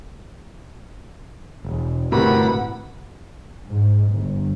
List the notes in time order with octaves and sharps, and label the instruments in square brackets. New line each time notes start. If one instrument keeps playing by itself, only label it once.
[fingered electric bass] E1
[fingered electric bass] G1 A2 [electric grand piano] C3 [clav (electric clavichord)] B3 F#4 A#4 [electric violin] F#5 B5
[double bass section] G#2
G1